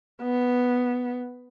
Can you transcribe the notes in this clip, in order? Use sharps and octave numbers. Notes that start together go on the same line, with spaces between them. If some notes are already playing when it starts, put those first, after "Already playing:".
B3